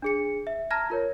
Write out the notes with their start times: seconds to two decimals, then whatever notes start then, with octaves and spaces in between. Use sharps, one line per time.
0.02 D4 G#4 C#7
0.47 E5
0.71 A5 A#5 F6 G#6 A#6
0.90 F4 A#4 C#5